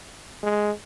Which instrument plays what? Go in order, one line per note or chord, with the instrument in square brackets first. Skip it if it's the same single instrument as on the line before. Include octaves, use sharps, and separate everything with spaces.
[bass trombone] G#3